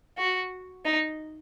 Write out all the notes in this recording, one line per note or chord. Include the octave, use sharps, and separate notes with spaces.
F#4
D#4